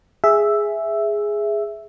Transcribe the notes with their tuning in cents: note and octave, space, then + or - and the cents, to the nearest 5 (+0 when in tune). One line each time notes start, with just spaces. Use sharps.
G#4 +0 E5 +0